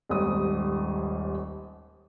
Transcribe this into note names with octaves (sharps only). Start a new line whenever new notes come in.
D#1 G#1 D#2 D#6